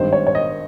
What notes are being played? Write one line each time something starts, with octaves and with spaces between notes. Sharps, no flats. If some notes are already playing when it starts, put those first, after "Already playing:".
Already playing: G#1 G2 D#3 C5
C#5
C#5
D#5